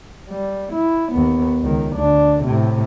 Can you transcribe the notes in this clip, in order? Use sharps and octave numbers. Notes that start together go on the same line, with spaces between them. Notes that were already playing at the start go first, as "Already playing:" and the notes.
G3
E4
D#2 B3
C#2 D#3
D2 D4
A2 C3